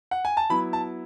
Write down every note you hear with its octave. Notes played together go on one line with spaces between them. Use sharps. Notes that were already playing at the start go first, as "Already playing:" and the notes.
F#5
G#5
A5
F#3 B3 E4 B5
A5